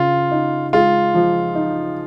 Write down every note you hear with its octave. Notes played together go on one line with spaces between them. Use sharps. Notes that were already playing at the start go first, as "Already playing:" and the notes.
Already playing: C#3 F4
D#4
G#3 F4
F3
D#4